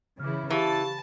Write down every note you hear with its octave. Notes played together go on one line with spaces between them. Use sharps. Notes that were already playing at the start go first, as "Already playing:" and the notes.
C#3 E3 E4 D6 F6
E3 G4 F5 A5 C#6